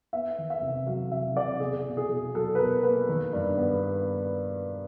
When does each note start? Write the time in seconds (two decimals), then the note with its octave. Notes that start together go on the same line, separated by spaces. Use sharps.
0.13 B3 E5
0.38 D#3
0.50 E5
0.62 C3
0.87 F#3 F5
1.12 C3 E5
1.36 C3 D5
1.60 B2 G#4
1.86 B2
1.97 G#4
2.09 B2
2.34 F#3 A4
2.55 B4
2.59 B2 A#4
2.83 A#3 B4
3.09 D#3
3.33 G2
3.57 B3